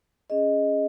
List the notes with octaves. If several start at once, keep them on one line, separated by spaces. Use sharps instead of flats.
C#4 G#4 D#5